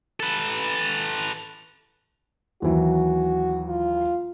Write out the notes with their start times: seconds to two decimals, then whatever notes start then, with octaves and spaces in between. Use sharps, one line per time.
0.20 A4 B4
2.62 D#2 E3 F#3 F#4
3.69 F4